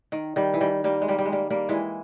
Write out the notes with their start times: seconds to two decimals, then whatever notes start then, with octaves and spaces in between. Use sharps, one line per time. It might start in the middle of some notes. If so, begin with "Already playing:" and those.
0.12 D#3
0.36 D#3 G3
0.54 E3
0.61 D#3 G3
0.84 G3 A#3
1.02 G#3
1.08 G3 A#3
1.19 G3
1.26 G#3
1.32 G3 A#3
1.50 G3 A#3
1.69 E3 G#3